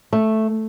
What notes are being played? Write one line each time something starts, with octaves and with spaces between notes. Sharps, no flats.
A3